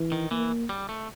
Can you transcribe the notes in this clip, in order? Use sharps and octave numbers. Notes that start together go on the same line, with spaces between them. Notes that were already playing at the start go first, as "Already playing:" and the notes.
Already playing: E3
D#3
E3 A#3
G3
A3